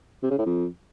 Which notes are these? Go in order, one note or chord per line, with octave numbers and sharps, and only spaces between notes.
C3
C#3
A2
F2